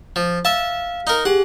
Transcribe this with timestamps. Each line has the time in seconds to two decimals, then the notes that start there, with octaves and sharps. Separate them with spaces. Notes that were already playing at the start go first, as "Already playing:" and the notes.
0.16 F3
0.45 E5 F5 A5
1.07 D#4 A#4
1.25 G4 G#4 F#5